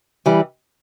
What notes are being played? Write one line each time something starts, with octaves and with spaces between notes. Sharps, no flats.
E3 G3